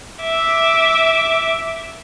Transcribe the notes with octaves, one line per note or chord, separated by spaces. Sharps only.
E5 D6